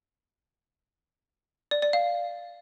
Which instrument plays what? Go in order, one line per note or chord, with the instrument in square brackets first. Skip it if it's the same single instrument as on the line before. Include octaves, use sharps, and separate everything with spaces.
[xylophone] D5
D5
F5